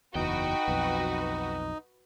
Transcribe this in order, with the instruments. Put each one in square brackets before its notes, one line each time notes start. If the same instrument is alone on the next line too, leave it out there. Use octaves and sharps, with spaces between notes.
[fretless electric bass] F#1 E2 [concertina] D#4 [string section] F#4 B4 [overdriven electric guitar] G5
[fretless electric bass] B1 F2